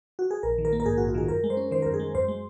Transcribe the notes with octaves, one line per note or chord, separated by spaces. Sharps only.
F#4
G#4
A#1 A#4
D#3
A#4
A#3
A#4
G#2 G#4
A#1 F#4
F4
D#3 G#4
F#2 A#4
G#3
C5
C#4
D#3 C5
F#2 A#4
G#4
G#3
F#2 C5
G#3